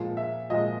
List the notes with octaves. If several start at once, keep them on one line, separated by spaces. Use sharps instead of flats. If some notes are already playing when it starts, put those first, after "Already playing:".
Already playing: A#2 F3 G#3
E5
A#2 F3 G#3 D#5